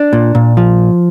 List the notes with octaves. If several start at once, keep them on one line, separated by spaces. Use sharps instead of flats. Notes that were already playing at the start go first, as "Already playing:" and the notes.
Already playing: D4
A#2
A#2
F3